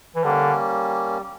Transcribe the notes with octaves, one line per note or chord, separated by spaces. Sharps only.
E3
D3 G3 A#3 C#4